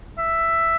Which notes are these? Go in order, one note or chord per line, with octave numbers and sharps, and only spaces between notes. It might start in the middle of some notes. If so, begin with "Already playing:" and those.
E5